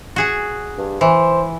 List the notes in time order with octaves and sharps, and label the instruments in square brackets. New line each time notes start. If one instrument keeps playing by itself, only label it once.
[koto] F#4 G#4 F#5
[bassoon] G2
[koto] E3 [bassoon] C5